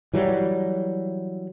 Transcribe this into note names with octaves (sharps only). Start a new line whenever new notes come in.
E3 F#3 G3